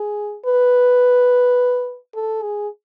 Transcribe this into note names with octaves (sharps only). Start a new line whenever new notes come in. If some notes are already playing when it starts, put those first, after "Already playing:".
Already playing: G#4
B4
A4
G#4